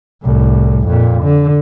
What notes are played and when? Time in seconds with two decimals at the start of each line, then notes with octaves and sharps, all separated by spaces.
0.23 C2 A2
0.87 F2 A#2
1.23 D3